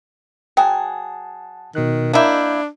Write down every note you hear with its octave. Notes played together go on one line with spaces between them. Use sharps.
F#3 G#4 F#5 G5 A5
B2 D#3 F#6
A#3 D4 E4 D#5 G6